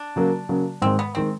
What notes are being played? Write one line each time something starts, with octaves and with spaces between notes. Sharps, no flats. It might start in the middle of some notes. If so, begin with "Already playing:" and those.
Already playing: D4
C#3 F#3 A#3
C#3 F#3 A#3
G#2 D#3 G#3 C4
B3
D#3 G#3 C4